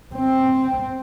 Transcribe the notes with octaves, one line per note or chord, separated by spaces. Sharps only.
C4